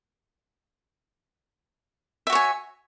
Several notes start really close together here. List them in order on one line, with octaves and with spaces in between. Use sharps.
E5 F#4 C#5 G#5